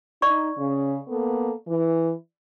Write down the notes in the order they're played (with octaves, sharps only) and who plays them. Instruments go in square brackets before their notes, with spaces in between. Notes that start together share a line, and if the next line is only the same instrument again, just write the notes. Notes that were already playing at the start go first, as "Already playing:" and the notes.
[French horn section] D#4 [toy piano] D5 C#6
[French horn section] C#3
A#3 B3 A4
E3